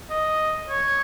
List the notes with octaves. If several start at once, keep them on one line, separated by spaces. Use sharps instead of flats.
D#5
C#5